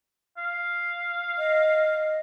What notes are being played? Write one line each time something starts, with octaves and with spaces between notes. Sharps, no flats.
F5
D#5